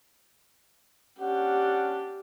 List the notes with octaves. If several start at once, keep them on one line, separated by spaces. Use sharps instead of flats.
C#4 D4 G4 F#5